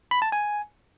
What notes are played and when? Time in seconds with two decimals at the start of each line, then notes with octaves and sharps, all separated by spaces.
0.11 B5
0.22 A5
0.32 G#5